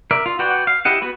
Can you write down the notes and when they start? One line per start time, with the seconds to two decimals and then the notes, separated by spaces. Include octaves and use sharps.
0.11 A#4 D5 E5
0.26 F4
0.39 F#4 B4 D5 F#5 G5
0.67 F5
0.85 E4 G4 D#5 F#5
1.02 B3 F#4 B4